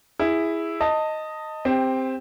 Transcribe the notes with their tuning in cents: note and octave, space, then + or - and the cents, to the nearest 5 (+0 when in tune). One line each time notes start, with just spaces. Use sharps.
E4 +0 G#4 -10
D#5 +0 A5 +25
C4 +0 G4 +25